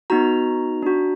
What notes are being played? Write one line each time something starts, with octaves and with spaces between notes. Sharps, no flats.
B3 D#4 F#4 A#5
D4 F#4